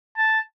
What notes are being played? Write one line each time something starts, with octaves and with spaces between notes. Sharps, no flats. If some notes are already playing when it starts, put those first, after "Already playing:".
A5